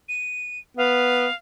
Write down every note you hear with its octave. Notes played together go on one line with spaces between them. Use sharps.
D#7
B3 F5